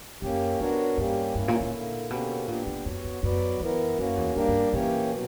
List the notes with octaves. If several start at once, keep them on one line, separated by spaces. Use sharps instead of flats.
F#2 A#3 C#4 G4
F#2 B3 D4 F#4 A#4 C#5
G2 G3 A#3 C#4 G4
G2 A#3 C#4 E4
A#2
A#2
D3 A#3 E4
B2 D3 A#3 C#4 G4
A#2 B3 D4 G4
A#2
F#2 B3 F#4 C#5
F#2
F#2 F#3 B3 F#4 B4 D5
F#2 E3 B3 E4 A#4
F#2 A#3 C#4 F#4
E2
F#2 G3 A#3 D4 G4 A#4
G2
A#2 E3 A#3 C#4 G4 C#5
B2 F#3